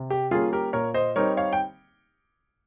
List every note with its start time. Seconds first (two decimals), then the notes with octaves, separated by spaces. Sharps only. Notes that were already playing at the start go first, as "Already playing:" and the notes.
Already playing: C3
0.10 G4
0.31 G3 A#3 C#4 F4 G#4
0.53 G4 A#4
0.73 A#2 A#4 C#5
0.94 C5 D#5
1.16 G3 C4 D#4 A#4 C#5
1.37 C#5 F5
1.53 G5